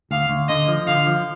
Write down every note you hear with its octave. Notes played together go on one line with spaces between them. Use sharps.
D2 F5
D2
D3 D#5
F3
D3 F5
F3